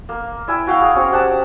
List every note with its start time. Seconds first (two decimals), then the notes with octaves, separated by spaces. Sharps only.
0.09 A#3
0.48 E4 E5 G5 G#5
0.67 F#4 F5 G5
0.82 G#4
0.95 C4 C#4 F#4
1.12 G4 F#5 A5 E6